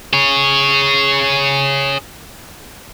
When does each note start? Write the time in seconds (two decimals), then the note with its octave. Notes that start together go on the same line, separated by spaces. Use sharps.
0.13 G#4 C#5